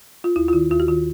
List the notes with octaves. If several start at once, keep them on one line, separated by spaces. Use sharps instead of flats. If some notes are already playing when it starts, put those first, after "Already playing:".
F4
D#2 E4
F4
D#3 E4
D#2 F4
F#4
D#3 F4